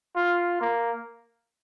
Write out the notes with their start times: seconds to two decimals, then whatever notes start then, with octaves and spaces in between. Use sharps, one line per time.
0.16 F4
0.61 A#3